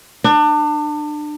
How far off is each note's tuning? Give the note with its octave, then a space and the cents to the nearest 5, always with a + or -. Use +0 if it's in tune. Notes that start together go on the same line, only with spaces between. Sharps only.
D4 +30